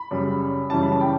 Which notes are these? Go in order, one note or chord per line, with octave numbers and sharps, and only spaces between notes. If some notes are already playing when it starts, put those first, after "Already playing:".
Already playing: B5
F#2 C#3 G3
F#2 C#3 E3 G3 C#4 A5
B5
A5
G5